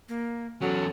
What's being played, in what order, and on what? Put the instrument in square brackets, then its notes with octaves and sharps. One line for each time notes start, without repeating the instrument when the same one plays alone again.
[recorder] A#3
[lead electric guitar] E2 C#4 [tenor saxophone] F#3 [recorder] A4